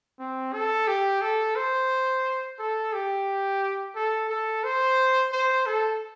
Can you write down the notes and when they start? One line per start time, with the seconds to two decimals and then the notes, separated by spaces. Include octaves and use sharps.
0.19 C4
0.53 A4
0.88 G4
1.22 A4
1.56 C5
2.59 A4
2.93 G4
3.95 A4
4.30 A4
4.64 C5
5.32 C5
5.67 A4